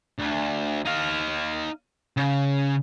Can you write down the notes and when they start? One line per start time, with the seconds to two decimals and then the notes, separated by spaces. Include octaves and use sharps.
0.18 D2
0.85 D#4 F5
2.17 C#3